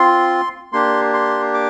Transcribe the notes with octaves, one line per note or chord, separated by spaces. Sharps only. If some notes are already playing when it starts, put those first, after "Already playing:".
Already playing: C4 F4 C6
A#3 D4 G4 C6
C6
D6